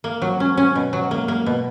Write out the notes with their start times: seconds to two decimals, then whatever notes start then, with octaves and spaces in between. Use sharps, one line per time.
0.04 A#3
0.22 F#3
0.40 C#4
0.57 C#4
0.75 B2
0.93 F#3
1.11 A#3
1.28 A#3
1.46 B2